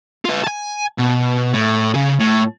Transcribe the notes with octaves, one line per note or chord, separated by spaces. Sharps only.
F4 B4
G#5 A5
B2
A2
C#3 G#4
A2